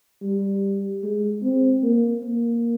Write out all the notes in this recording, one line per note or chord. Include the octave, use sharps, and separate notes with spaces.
G3
G#3
C4
A#3
A#3